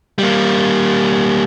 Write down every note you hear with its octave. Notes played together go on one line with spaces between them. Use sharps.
G3 A#3